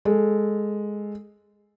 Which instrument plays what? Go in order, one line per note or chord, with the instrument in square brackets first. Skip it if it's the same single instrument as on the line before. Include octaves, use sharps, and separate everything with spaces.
[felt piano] G#3 A4